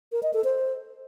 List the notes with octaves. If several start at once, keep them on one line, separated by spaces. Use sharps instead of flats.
A#4
D#5
A4
C5